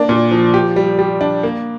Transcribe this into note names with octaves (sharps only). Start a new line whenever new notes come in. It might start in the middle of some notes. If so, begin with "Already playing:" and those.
Already playing: A#3 D4
A#2
F3
G4
G3
G3
D4
A#3